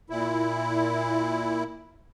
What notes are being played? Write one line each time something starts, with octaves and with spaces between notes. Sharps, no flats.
A#2 E4